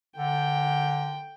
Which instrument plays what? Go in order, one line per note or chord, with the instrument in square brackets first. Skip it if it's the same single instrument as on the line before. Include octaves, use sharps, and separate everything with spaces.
[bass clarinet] D3 [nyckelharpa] G5